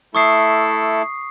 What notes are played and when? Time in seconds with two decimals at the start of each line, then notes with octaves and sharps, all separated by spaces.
0.15 A3 E4 A4 C#6 D#6 C7